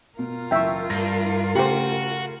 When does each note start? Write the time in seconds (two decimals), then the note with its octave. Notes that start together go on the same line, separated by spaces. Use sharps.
0.19 B2 F4 A#4
0.51 F#1 E3 E5 G5 C#6
0.90 G2 A#6
1.25 E4
1.55 C#3 A3 F#4 G4 C5 F#5